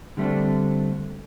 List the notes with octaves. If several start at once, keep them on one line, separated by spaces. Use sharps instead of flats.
D3 G3 A3 C4 D4